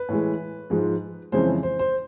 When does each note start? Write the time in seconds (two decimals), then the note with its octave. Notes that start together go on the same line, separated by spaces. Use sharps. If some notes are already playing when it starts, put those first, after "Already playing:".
Already playing: B4
0.09 A2 E3 G#3
0.70 G#2 F3 G#3
1.32 F2 C#3 E3 G#3 C5
1.63 C5
1.79 C5